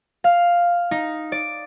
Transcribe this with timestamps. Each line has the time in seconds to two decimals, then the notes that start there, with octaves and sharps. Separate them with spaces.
0.24 F5
0.91 D#4
1.32 D5